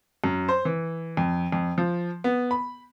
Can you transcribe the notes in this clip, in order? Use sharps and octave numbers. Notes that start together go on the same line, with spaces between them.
F#2
C5
E3
F2
F2
F3
B3
B5